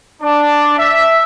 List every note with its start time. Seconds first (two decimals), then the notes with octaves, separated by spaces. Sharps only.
0.22 D4
0.78 E5